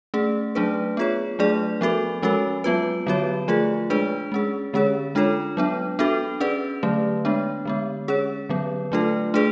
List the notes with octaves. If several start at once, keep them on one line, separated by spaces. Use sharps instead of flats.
A3 C#4 G#4
F#3 A3 D4 G#4 B4
B3 F4 G#4 C#5
F#3 A3 D4 G#4 D5
F3 B3 F#4 A4
F3 G#3 C#4 F#4 A4
F#3 B3 F4 B4
D3 F#3 B3 F#4 C#5
F3 A3 F4 G#4
G#3 D4 G#4 B4 D5
G#3 C#4 G#4
D3 G#3 C#4 G#4 C#5
G#3 D4 F4 A4 C#5
F#3 B3 D4
B3 D4 F#4 A4
C#4 G#4 B4 D5
D3 F#3 A3
G#3 B3 D4
D3 G#3 B3
C#4 G#4 C#5
D3 F#3 B3
F#3 A3 D4 F4 A4
A3 D4 G#4 B4 D5